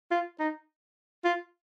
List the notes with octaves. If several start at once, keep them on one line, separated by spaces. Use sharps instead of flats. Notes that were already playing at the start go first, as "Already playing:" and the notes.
F4
D#4
F4